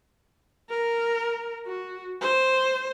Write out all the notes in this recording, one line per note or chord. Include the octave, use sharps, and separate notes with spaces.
A#4
F#4
C5